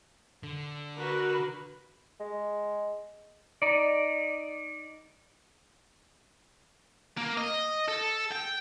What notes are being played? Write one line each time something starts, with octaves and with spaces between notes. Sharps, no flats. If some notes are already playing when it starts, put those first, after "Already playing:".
D3
F#4 A#4 B4
G#3
D#4 D5
A#3
D#5
A4
G5